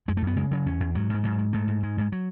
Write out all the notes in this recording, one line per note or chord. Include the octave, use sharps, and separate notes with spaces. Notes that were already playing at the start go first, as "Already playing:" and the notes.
F#2 G#3
A3
F#2 B3
C#3 G#3
C#3 F#3
E2 C#4
E2
G#2 F#3
G#2 G#3
G#2 F#3
G#2
G#2 A3
G#2
G#2 G#3
G#2 G#3
F#3